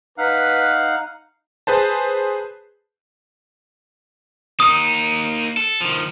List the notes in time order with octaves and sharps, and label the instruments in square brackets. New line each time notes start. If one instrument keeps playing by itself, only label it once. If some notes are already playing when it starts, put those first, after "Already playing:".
[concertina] D#4 F5 F#5 [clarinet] B4
[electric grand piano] G#4 B4 C5 A5
[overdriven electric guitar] A#3 D#4 [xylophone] D#6
[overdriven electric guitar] A4
D#3 F3